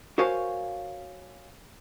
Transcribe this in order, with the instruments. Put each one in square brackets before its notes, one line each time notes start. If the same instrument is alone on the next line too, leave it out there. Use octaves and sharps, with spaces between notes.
[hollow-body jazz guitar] F#4 A#4 C5 C#5 F5 G#5